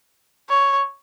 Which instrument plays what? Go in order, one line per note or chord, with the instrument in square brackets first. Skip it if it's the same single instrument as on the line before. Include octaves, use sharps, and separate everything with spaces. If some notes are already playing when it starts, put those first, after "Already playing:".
[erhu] C#5